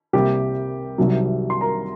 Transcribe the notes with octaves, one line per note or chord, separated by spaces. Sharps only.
C2 C3 G3 A#3 G4 G5
C2 C3 D#3 F#3
C6
A#4 A#5